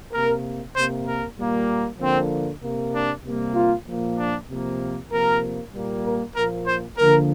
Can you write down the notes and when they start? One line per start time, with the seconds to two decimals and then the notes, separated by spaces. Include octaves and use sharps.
0.12 C3 A#3 A#4
0.74 C3 A#3 C5
1.06 A#4
1.37 A#2 G3 A#3
1.99 D3 F3 A#3 C4
2.62 C3 A#3
2.93 D4
3.24 C3 G3 A#3
3.55 F4
3.86 A#2 F3 A#3
4.17 D4
4.48 C3 F3 A#3
5.10 C3 F3 A#3 A#4
5.72 A#2 G3 A#3
6.03 A#4
6.35 A#2 F3 A#3 A#4
6.66 C5
6.97 D3 F3 A#3 A#4